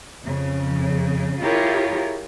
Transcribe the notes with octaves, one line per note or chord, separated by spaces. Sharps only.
F2 C#3
E4 F4 G4 G#4 A#4 C#5